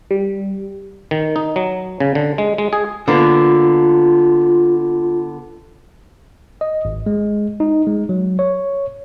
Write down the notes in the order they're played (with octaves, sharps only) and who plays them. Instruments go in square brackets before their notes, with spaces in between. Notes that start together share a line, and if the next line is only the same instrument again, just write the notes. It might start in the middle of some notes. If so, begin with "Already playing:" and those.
[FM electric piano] G3
[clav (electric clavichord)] D#3
D#4
F#3
C#3
D3
G#3
G#3
G#4
[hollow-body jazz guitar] D3 A#3 B3 [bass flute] F4
[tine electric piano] D#5
G#1
G#3
D#4
G#3
F#3
C#5